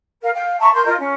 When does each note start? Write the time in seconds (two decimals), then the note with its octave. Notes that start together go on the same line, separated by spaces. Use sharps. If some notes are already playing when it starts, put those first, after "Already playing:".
0.21 A#4 F5
0.33 F5 G5
0.59 E5 A5 A#5 C#6
0.73 A#4 C6 G6
0.85 F4 A#4 D#5
0.99 C#4